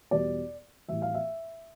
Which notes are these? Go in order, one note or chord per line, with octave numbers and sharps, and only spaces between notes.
E2 B2 G3 D5
A2 E3 G3 E5
F5
E5